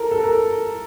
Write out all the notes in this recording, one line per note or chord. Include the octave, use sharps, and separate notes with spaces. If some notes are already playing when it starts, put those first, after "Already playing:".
Already playing: A4 A#4
A4
A#4